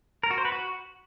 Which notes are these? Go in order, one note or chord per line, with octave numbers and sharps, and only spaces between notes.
A#4
F#4
C5
B4
F#4